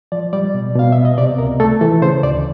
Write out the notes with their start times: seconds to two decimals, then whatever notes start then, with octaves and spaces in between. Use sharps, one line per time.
0.12 F3 D5
0.33 G3 D5
0.54 B2
0.75 B2 F5
0.92 B3 E5
1.05 D#5
1.18 C3 D5
1.38 C#2 A#4
1.60 A3 A4
1.81 E3 A4
2.02 C#3 C5
2.23 D2 D5